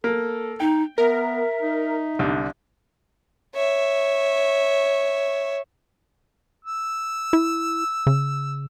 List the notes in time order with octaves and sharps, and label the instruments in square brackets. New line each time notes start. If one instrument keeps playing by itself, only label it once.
[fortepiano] A#3 [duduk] A4
[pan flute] D#4 [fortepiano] G5
[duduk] B3 [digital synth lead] A#4 [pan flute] E5
[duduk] D#4
[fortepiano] C2 D3 G3
[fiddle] C#5 E5
[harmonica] E6
[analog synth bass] E4
C#3